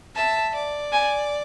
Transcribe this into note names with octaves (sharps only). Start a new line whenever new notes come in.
E5 A5
D5
G#5